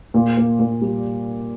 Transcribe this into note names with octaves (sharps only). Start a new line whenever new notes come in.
A#2
A#3
A#2
G3